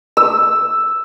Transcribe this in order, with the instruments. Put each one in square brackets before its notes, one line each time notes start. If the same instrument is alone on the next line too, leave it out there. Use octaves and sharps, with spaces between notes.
[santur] E6